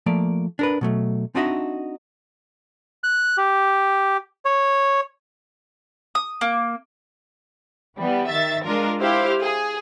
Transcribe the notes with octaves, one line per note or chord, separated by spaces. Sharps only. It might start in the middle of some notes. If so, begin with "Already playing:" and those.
F3 A3 A#3 D5
D4 A#4 B4
B2 F#3 A3
C4 D4 D#4 F#4 D#5 E5
F#6
G4
C#5
D#6
A#3
E3 G3 B3
D#3 E5 A6
G#3 D4 F4 A#4
E4 G4 C5 F5
G#4